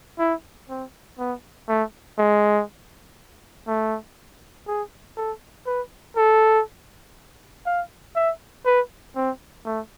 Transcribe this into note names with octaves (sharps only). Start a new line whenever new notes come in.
E4
C4
B3
A3
G#3
A3
G#4
A4
B4
A4
F5
E5
B4
C4
A3